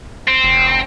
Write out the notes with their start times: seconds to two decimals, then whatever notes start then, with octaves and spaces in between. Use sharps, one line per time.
0.27 C4
0.44 F1